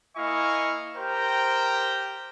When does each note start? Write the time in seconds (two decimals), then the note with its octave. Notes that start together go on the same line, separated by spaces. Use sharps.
0.17 A#3 E4 D#5 F5 G#5 C#6
0.96 G4 A#4 C5 G5 A#5